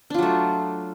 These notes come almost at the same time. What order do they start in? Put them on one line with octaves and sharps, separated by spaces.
D4 F4 F#3 A3